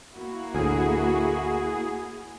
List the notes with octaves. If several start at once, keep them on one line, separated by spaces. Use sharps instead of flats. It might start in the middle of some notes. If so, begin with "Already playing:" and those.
A#3 E4 F#4
D2 A2 G#4